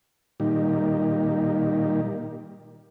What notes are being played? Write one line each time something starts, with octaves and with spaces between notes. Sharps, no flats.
A#2 D#3 G3